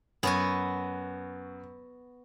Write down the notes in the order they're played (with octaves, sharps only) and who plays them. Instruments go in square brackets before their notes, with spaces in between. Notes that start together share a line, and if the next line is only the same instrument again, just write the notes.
[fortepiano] F#2 [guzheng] B3 F#4 G#5